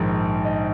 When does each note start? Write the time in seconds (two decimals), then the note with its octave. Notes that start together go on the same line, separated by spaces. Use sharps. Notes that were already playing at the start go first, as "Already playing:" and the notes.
Already playing: A#1 G#2 D#3
0.45 D#5